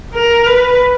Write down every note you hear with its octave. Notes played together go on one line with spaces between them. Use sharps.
A#4
B4